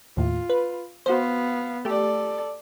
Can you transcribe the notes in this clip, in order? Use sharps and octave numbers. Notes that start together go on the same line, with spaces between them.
D#2 A2 F4
B4
B3 F#4 C5 F5
A3 G4 A4 D5